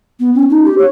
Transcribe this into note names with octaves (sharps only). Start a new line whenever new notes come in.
B3
C#4
D#4
G4
C#5